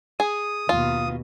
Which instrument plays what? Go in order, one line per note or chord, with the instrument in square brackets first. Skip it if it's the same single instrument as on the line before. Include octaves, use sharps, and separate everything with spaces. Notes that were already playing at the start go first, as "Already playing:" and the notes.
[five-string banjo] G#4 [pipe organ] D#6
[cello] D#2 B2 [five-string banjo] F4